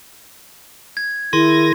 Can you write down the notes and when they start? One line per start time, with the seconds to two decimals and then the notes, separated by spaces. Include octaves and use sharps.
0.97 G#6
1.33 D#3 E4 G#4 A#4 C6